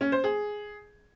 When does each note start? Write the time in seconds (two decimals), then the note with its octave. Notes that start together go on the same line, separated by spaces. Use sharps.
0.01 C#4
0.12 C5
0.24 G#4